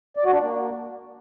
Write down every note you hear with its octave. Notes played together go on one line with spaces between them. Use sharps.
D5
F#4
D4
A#3